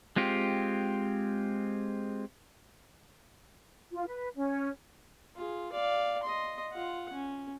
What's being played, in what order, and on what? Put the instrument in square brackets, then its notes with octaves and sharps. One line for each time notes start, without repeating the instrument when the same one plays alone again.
[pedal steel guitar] G#3 C4 F4 G4
[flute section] F4
B4
C#4
[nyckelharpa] F4 G#4
D5 F5
D#5 C6
F4 F#5
C#4